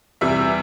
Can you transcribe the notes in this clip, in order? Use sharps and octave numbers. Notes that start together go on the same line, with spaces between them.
E2 C3 G3 E5